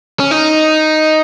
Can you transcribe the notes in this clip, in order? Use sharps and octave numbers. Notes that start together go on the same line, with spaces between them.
C#4
D#4